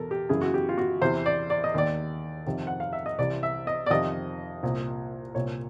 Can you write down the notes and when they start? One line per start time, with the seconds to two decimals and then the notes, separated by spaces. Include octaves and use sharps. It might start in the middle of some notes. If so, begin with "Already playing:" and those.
Already playing: E2 B2 A4 A#4
0.11 G4
0.29 F#2 C#3 E3 G#4
0.42 F#4
0.54 G4
0.69 F4
0.78 F#4
1.01 E2 C3 E3 C5
1.26 D5
1.50 D5
1.64 D#5
1.74 D#2 D#3 D5
2.46 F2 C3 D#3
2.67 F#5
2.80 F5
2.93 E5
3.06 D#5
3.18 C2 C3 E3 D5
3.43 E5
3.67 D#5
3.86 D5
3.90 F2 C3 D#3 D#5
4.63 C2 A#2
5.35 C2 A#2 C#5